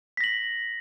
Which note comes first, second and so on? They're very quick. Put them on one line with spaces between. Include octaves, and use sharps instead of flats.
B6 A#6 F#7